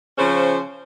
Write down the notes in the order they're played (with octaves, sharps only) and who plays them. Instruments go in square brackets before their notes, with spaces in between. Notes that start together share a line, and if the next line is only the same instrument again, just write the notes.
[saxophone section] C#3 F3 C#4 C5